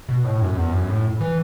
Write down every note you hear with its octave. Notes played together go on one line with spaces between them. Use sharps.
B2
A2
F#2
E2
F#2
A2
E3